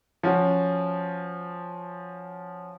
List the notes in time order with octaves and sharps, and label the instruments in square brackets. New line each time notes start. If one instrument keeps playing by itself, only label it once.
[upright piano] F3 C#4 F#4